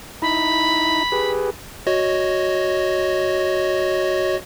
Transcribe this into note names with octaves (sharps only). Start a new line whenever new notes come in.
D#4 E4 A#5 B5
G4 G#4 B4
F#4 C#5 D#5